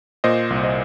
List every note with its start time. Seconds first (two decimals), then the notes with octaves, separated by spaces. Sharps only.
0.24 A#2 C5 D#5
0.50 C2
0.63 C5 D#5